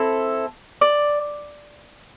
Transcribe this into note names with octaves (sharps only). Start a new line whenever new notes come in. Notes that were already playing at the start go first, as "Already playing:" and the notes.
Already playing: C4 E4 A4
D5